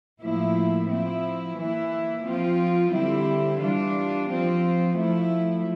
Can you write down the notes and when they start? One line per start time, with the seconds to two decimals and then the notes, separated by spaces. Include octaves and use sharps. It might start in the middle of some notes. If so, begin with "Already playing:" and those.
0.21 A2 F3 A#3 E4
0.89 F3 C4 E4
1.57 E3 A#3 E4
2.25 F3 C4 F4
2.92 D3 G3 C4 E4
3.60 E3 G3 D4 F4
4.29 F3 C4 F4
4.96 F3 A3 E4